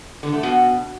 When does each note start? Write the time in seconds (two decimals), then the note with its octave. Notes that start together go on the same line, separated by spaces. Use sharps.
0.23 D3
0.33 A3
0.43 B2